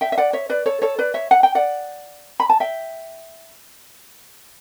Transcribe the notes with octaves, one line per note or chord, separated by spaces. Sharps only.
E5 G5
E5
D5 F#5
C#5 E5
B4 D5
A4 C#5
A4 C#5
B4 D5
C#5 E5
F#5
G5
D5 F#5
B5
A5
E5 G5